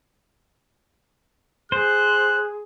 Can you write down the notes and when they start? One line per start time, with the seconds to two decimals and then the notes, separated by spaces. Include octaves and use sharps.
1.72 G#4 C5 F#6